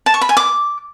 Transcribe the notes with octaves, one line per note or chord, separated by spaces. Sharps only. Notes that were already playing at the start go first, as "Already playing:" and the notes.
A5
C#6
B5
G#5
D6